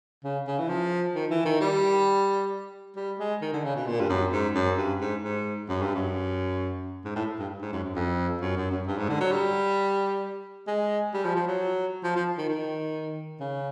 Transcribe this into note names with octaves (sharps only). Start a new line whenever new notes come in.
C#3
C#3
E3
F3
D#3
E3
D#3
G3
G3
G#3
D#3
D3
C#3
B2
A#2
G2
F#2
G#2
F#2
G2
G#2
G#2
F#2
G2
F#2
G#2
A2
G2
G#2
F#2
F#2
F2
F#2
F#2
F#2
G2
G#2
D3
F#3
G3
G#3
G3
F3
F3
F#3
F3
F3
D#3
D#3
C#3